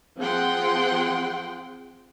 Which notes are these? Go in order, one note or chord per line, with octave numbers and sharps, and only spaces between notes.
F3 C4 G#4 F#5 G5 C6